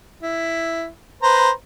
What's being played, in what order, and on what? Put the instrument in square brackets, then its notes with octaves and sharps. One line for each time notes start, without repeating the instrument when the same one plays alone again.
[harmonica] E4
B4 C5 A#5